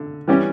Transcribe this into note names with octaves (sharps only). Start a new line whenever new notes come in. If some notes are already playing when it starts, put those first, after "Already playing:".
Already playing: D3
E3 G3 C#4 G4